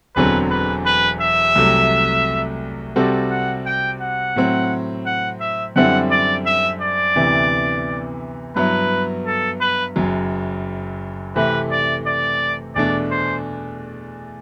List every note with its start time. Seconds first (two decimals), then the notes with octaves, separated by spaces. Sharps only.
0.16 E1 E2 D3 F#3 C4 B4
0.50 B4
0.86 B4
1.21 E5
1.56 C2 C3 F#3 A3
2.96 C3 G3 C4 F#4 A4
3.31 F#5
3.66 G5
4.01 F#5
4.36 A2 F#3 C4
5.06 F#5
5.41 E5
5.76 F#2 D3 G3 C4 E4 F#5
6.11 D5
6.46 E5
6.82 D5
7.16 D2 C3 E3 B3
8.56 G2 F#3 B3 E4 B4
9.26 A4
9.61 B4
9.96 F#1 F#2 F#3
11.36 C3 E3 A3 C4 B4
11.72 D5
12.06 D5
12.76 E2 B2 A3 D4 D5
13.11 C5